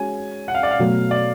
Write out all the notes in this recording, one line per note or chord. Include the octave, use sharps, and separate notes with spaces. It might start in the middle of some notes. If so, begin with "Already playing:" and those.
Already playing: G#3 C#4 F#4 G#5
F#5
F5
D5
F5
B2 F#3 A3
D5